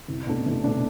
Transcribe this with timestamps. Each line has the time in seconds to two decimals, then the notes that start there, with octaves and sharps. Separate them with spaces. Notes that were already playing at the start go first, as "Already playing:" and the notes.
0.08 C2
0.27 B2 A3 D4
0.46 C2
0.64 B2 A3 D4